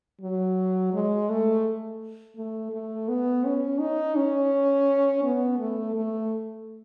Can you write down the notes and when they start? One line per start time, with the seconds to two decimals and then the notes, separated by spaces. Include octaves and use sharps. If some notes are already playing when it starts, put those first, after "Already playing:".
0.22 F#3
0.94 G#3
1.29 A3
2.37 A3
2.73 A3
3.08 B3
3.45 C#4
3.80 D#4
4.16 C#4
5.24 B3
5.59 A3
5.95 A3